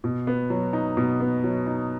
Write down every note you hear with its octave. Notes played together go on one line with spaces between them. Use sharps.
B2
B3
F#3
D#4
B2
B3
F#3
D#4